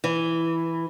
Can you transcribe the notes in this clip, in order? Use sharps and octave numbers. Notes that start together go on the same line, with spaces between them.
E3